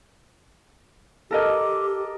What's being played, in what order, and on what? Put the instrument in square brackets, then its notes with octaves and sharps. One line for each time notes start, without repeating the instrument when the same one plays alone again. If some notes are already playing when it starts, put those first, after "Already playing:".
[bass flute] G4 [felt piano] A4 A#4 D#5